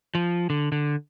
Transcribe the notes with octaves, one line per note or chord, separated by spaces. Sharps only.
F3
D3
D3